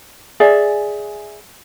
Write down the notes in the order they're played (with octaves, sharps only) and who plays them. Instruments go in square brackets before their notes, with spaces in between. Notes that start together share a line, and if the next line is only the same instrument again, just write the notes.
[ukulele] G#4 D5 E5